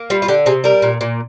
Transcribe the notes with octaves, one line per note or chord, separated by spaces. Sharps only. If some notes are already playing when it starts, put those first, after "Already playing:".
Already playing: A#3
G3 F4
F4
D3 G4
C3 G#4
G3 A#4
A#2
A#2